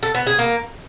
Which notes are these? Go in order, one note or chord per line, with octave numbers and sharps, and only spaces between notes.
A4
B3
G#4
A#3